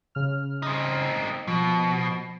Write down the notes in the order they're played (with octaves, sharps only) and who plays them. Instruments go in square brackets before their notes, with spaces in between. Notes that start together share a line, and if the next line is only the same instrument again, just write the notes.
[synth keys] C#3 F6
[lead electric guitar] C4 D#4
[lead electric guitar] B2 [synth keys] F3